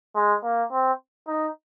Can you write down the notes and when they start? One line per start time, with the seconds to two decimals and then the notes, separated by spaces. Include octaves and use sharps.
0.16 G#3
0.44 A#3
0.73 C4
1.28 D#4